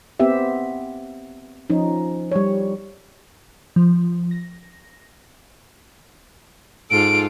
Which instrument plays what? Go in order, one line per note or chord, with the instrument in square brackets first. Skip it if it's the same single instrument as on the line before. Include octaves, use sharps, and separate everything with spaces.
[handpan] B3 C4 G4 E5
F3 C#4 D#4
G3 C#5
[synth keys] F3
A#6
[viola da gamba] G#2 F4 A4 [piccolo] D7